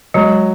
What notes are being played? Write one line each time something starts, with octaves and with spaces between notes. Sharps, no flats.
F#3 G#3